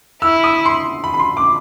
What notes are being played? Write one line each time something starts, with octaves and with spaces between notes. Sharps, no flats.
E4 E6
D#6
C6
B5
B5
C6
D6